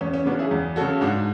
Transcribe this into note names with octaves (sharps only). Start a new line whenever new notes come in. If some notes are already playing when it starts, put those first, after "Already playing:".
E2 C#4
C#4
C#3 F#3 B3 D4
E4 G#4
E2
C#3 F#3 F#4 A4
G#2 D4 F#4